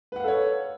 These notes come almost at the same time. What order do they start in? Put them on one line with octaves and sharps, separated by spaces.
B4 F#5 F5 A4 C#5